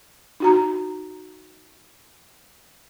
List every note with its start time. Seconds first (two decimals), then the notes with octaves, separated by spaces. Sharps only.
0.40 D#4 F#4 A#5